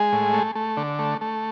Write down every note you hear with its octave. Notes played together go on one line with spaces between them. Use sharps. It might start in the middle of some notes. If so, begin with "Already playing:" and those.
Already playing: G#3 G#4
A2
A3
A3
D3
A3
A3